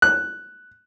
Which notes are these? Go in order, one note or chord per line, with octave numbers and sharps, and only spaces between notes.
F#6